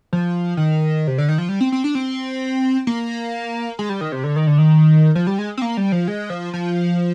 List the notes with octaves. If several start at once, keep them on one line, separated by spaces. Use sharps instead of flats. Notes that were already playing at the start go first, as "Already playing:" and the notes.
F3
D#3
C3
D3
D#3
F3
G3
C4
C4
D4
C4
A#3
G#3
G3
D#3
C3
D3
D#3
D3
D#3
F3
G3
G#3
C4
A#3
G3
F3
G#3
F3
F3